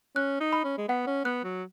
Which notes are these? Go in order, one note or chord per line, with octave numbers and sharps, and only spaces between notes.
C#4 F#6
D#4
B5
C#4
G#3
B3 F#5
C#4
B3 F#6
F#3